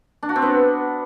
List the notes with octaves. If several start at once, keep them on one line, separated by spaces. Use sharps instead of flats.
D4
F#4
C4
B3